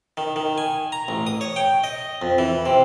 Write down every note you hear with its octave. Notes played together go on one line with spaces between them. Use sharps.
D#3
D#3
G#5
A#5
A1
D#6
C#5
G5
D#5
F2
E3
C3